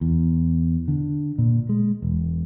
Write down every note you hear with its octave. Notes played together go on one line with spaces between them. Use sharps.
E2
D3
A#2
G#3
E1